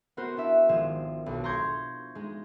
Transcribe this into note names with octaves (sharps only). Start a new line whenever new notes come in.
B3 F#4 A#4 C5
D4 E4 E5
G#1 F3 G#3 E7
B1 D4
A#5 C6 C#6 G6 G#6
G#3 D#4